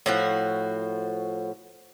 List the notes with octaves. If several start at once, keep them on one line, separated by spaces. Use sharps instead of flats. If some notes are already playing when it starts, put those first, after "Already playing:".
A2 F3 F#4